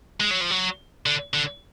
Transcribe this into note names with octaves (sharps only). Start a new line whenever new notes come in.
G#3
F#3
F3
F#3
D3
D3